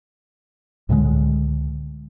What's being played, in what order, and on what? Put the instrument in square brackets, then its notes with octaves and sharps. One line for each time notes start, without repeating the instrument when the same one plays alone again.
[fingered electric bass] C#2 A2 D3 G#3